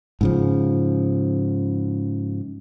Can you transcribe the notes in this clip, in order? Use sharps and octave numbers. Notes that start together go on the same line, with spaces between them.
G#2 C#3 F3